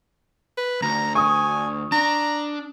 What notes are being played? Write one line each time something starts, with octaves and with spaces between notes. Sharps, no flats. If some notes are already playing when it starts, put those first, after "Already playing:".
B4
D2 A#5
G#5 C#6 D#6
D4 A#5